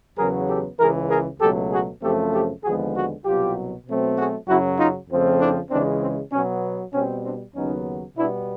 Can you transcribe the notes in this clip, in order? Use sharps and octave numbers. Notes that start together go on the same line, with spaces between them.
E2 C#3 F#3 B3 G#4 A#4
G4 A4
C#2 C#3 E3 G#4 A#4
G#4 A#4
C#2 B2 F#3 A3 G4 A4
F#4 G#4
F#2 C#3 F3 A3 C4 G4 A4
G4 A4
D#2 D3 F3 G#3 B3 F#4 G#4
F#4 G#4
C2 B2 F#3 F4 G4
B2 F#3 A3 C4
F#4 G#4
F#2 C#3 F#3 E4 F#4
D#4 F4
F2 C#3 F3 A3 C4
D4 E4
C#2 C#3 E3 G#3 C4 D4
C4
B2 F#3 B3 C#4
B2 G3 C4 C#4
C4 D4
D#2 C#3 F#3 B3 C#4 D#4
B2 G3 B3 D4 E4